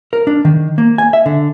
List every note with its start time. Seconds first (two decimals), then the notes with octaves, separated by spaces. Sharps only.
0.13 A#4
0.27 D4
0.45 D#3
0.78 A#3
0.98 G#5
1.13 E5
1.26 D3